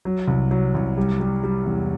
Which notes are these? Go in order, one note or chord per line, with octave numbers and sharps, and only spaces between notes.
F#3
C2
F#3
C2
G3
G3
G3
E2